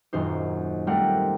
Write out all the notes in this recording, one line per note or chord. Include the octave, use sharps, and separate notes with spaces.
D#1 F#2 D#4 C5
G3 A3 C4 A#4 F#5